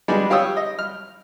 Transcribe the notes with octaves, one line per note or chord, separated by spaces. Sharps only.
G3 G#3 B3 D4 G#4
F4 G4 C#5 D#6 E6
D#5
F6